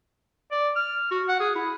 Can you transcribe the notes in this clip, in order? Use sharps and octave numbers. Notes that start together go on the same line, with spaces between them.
D5
F6
F#4
F#5
G#4
E4